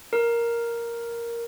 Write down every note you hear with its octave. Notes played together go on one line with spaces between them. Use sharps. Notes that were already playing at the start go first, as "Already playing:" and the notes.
A#4